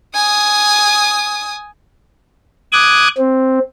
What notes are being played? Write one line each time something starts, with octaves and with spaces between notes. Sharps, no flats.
G#5 D#6
D6 D#6 F#6 G#6
C4